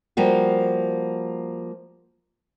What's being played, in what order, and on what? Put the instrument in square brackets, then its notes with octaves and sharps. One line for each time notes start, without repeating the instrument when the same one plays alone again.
[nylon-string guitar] F3 G3 A#3 F#4